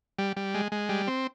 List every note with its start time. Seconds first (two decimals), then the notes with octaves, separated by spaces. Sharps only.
0.19 G3
0.37 G3
0.54 G#3
0.72 G#3
0.89 G3
1.07 C4